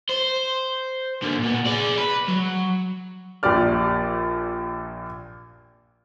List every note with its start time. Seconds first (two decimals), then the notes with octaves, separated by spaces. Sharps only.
0.10 C5
1.22 D3 A#3
1.39 A#2 B3
1.66 G#4 D5
1.98 B4
2.28 F#3
3.43 A#1 A#2 G4 D5 F6